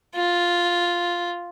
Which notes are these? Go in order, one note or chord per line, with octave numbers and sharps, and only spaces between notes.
F4